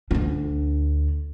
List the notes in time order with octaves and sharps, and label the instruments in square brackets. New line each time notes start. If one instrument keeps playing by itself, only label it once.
[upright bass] D2 D4